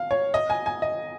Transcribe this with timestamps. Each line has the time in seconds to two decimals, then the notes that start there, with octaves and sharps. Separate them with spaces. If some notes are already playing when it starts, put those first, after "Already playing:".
Already playing: F5
0.11 C#5
0.34 D#5
0.50 G#5
0.66 G#5
0.82 D#5